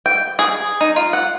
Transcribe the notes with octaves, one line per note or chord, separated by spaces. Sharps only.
G5
G#4
D#4
F4
F#5